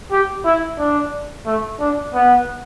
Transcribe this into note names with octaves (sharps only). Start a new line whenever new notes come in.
G4
E4
D4
A3
D4
B3